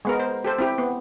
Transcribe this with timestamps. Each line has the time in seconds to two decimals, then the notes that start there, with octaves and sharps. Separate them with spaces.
0.05 G#3 B3 A#4
0.20 C5
0.44 G4 A4 C5
0.59 C4 E4 G4
0.78 B3